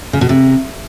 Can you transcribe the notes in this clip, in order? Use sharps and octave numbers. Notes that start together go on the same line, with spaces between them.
C#3
B2
C3